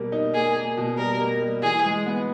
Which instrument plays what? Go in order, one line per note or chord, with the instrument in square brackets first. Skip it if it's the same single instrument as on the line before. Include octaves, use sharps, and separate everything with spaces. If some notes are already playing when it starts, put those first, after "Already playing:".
Already playing: [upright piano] B2 G3 A#3
D#4
[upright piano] A#3 [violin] G#4
[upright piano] A#3
B2
[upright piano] G3 [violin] A#4
[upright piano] A#3
G3
[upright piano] E3 [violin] G#4
[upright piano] G#3
B3